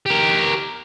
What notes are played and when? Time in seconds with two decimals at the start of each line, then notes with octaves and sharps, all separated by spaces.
0.06 G4 A#4